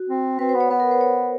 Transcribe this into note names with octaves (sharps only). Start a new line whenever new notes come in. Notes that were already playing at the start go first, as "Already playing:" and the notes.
Already playing: F#4
C4
C4 B4
C5
B3
C#5
B3 B4
A#4
C5
C#5